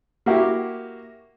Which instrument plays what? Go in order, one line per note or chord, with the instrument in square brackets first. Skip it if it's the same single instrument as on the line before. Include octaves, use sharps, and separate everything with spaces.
[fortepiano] A#3 E4 F#4 G4